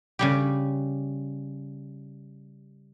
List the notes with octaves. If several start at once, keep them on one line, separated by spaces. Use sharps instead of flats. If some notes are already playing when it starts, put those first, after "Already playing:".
C#3 G3 G4